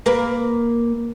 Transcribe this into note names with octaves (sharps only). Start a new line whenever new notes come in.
A#3 A#4 B4